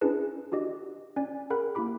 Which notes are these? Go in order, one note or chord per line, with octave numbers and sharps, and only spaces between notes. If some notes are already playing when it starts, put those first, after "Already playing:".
C#4 D4 E4 G#4 B4 A5
D4 F#4 G4 D#5
C#4 D5 G#5
G#4 A#4 F#5 G5 B5 F#6
A#3 E4 G4 B5 D6